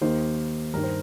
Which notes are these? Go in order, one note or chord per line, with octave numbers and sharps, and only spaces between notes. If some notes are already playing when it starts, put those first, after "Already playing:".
D#2 D#3 A#3 D#4 C5
G2 D#3 G3 A#4
C5